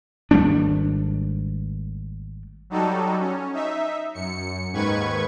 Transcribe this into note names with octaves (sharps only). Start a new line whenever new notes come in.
G#1 G3 A3 D4
F#3 G3 D#4 F#4 A4
C#4
D#4 E5
F#2 C#7
D#2 G#2 D#3 B4 C#6 G#6